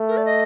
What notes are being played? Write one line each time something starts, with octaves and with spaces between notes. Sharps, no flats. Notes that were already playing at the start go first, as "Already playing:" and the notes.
Already playing: A3
A#4
D5
D#5